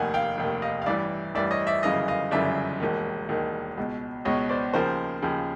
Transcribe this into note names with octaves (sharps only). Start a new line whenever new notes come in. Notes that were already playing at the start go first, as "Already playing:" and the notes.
Already playing: F1 D#2 D#3 F#5 G#5
F5 G5
F1 D#2 D#3
D#5 F5
F5
A1 G2 E3 D5 E5
A1 G2 E3 D5 E5
C#5 D#5
D5 E5
G1 F#2 C#3 E3 D#5 F5
D#5 F5
G1 F#2 C#3 E3 D5 E5
E1 D#2 D#3
E1 D#2 D#3
C#2 B2
C#2 B2 C#5 D#5
C5 D5
D#2 C#3 F3 A#4 C5
D#2 C#3 F3